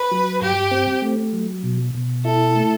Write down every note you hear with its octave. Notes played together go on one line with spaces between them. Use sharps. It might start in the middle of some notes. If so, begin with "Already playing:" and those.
Already playing: B4
F#3
G2 G4
C4
A3
F#3
B2
B2
E4 A4
A3